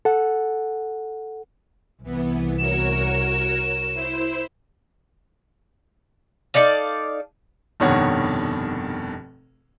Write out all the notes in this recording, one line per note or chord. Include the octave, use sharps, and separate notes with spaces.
A4 F#5
C2 E3 B3
F#4 A#4 C#5 E7
E4 C5
D#4 A4 D5 F5
F1 G2 B2 D#3 C#5 F#5